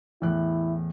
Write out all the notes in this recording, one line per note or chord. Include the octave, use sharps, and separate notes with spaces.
E2 A2 E4 F#6